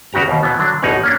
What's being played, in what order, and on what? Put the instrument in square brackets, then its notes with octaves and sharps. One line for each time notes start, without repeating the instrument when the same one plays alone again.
[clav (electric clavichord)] E2 C#3 F#4 G4 A#5
D#2 B2
B2 E3 B3
D3 F#3 D4
A1 E2 B2 D#4 C#5 F#5
A#3 C#4 D4